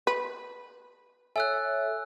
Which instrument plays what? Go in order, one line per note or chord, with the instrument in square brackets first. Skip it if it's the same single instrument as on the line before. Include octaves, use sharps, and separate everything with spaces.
[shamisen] B4
[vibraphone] A4 C#5 [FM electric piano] E5 [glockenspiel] G#5 E6 F#6